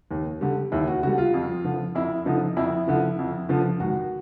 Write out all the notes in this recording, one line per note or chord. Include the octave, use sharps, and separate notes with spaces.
D#2
D3 G3
D#2 E4
F#4
D3 G3 F#4
F4
F2
D3 F3
F2 E4
D3 F3 D#4
F2 E4
D3 F3
F2
D3 F3
G#1 F#4